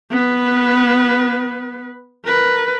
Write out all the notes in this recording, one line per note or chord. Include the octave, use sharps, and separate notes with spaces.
B3 B4
A#4 B4